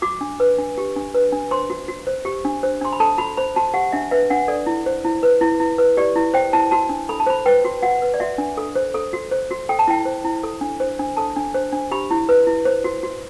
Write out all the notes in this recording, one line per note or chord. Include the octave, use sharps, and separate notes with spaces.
F#4 D6
D4
B4
D4
G4
D4
B4
D4
C5 C6
F#4
F#4
C5
G4
D4
C5
D4 C6
B5
A4 A5
F#4 B5
C5 B5
F#4 A5
G4 F#5
D4 E5
B4 E5
D4 F#5
A4 D5
E4
C5
E4
B4
E4
E4
B4
G4 D5
E4
C5 G5
E4 A5
F#4 A5
D4
A4 B5
A5
C5 B5
B4 G5
F#4
F#4 F#5
B4
D5
F#4 E5
D4
A4
C5
A4
F#4
C5
F#4
A4 G5
A5
E4 G5
C5
E4
A4
D4
C5
D4
A4 A5
D4
C5
D4
G4 B5
E4
B4
E4
C5
F#4
F#4